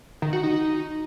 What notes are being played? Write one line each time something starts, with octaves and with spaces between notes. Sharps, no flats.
D#3
F#4
D#4